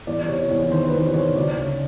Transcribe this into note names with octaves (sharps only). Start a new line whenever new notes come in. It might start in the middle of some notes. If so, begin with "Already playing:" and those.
E2 D5
C3 C#5
E2 C#5
D#3 C5
B4
E2 C5
C3 C#5
D2 D5
C#3